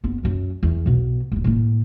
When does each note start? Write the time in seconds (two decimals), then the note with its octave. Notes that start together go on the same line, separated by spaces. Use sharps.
0.04 F#1 B3
0.23 F#2 F#3
0.63 E2
0.86 B1 B2
1.32 D1 C#2
1.44 A2 A#3